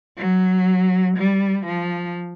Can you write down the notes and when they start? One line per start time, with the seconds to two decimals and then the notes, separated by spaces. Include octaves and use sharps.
0.17 F#3
1.17 G3
1.66 F3